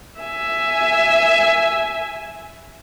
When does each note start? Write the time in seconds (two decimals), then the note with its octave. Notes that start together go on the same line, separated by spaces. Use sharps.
0.20 E5 G#5